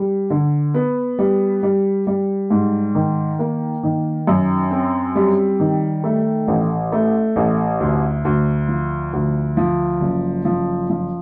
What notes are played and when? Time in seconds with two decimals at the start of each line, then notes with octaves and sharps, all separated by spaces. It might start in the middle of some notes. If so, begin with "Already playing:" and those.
Already playing: G3
0.30 D3
0.74 B3
1.19 G3
1.63 G3
2.07 G3
2.50 G#2
2.95 D#3
3.39 A#3
3.83 D#3
4.27 F#2
4.71 C4
5.15 G3
5.60 D#3
6.04 A3
6.48 A1
6.92 A3
7.36 A1
7.80 D2
8.25 D2
8.68 F3
9.13 D2
9.57 F3
10.01 F#1
10.45 F3
10.90 F3